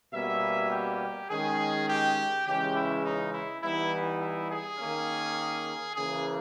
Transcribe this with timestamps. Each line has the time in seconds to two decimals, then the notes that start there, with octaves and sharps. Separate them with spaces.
0.14 B2 G3 A#3 C#4 E5
0.71 G4
1.30 D#3 G#3 C#4 G#4
1.88 G4
2.46 C#3 E3 G#3 C#4 G4
2.75 E4
3.05 D#4
3.34 E4
3.63 E3 G3 B3 D#4 E4
4.21 E4
4.51 G#4
4.79 D#3 A#3 C#4
5.96 C#3 E3 A#3 G#4